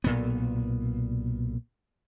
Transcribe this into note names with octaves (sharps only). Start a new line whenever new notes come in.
B1 A#2 B3